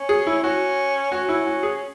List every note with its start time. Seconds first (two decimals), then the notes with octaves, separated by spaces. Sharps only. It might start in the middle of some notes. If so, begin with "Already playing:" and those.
Already playing: C#4
0.09 G#4
0.27 E4
0.43 C#4 F#4
1.12 C#4 F#4
1.29 E4
1.47 F#4
1.63 G#4